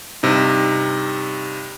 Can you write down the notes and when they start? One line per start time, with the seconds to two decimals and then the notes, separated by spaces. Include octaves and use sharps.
0.23 G2 C3 D#4